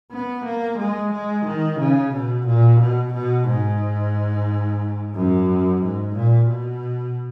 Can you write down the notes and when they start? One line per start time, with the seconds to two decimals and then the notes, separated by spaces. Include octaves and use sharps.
0.12 B3
0.45 A#3
0.78 G#3
1.12 G#3
1.46 D#3
1.79 C#3
2.13 B2
2.46 A#2
2.80 B2
3.13 B2
3.48 G#2
5.15 F#2
5.82 G#2
6.16 A#2
6.49 B2